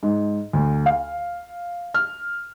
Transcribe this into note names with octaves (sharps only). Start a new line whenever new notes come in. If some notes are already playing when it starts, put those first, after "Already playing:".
G#2
D2
F5
F6